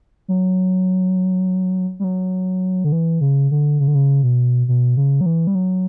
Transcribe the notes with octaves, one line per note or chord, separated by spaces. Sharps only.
F#3
G3
F#3
D3
E3
C#3
D3
C#3
D3
C#3
B2
B2
C#3
F#3
E3
G3
F#3